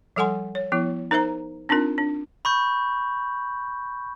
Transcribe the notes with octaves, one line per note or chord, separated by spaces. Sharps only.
F3 G3 A4 F#5 G#5 C6
C#5
F3 B3 E4
D#4 A#4 C5 E5 A#5
C4 D4 D#4 F4 A#4
D4
B5 C#6 G6